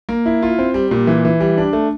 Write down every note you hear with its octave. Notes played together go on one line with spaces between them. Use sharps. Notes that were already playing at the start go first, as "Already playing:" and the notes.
A#3
E4
F4
C4
G3
A#2
E3
E3
G3
D4
A3